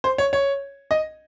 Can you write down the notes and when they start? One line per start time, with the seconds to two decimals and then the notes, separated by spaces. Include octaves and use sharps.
0.04 C5
0.18 C#5
0.33 C#5
0.91 D#5